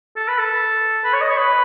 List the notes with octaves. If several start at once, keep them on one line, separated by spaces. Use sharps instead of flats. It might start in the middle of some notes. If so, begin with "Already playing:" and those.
A4
B4
A4
B4
C#5
D#5
C#5
B4